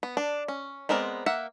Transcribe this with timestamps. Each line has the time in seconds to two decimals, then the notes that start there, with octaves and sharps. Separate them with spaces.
0.03 B3
0.17 D4
0.48 C#4
0.89 G#3 B3 C4 A#4 D5
1.26 A#3 E5 F#5